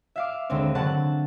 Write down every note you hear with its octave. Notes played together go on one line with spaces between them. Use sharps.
E5 F5 D6
D#2 D3 G#3 C4
D3 F#3 F#5 A5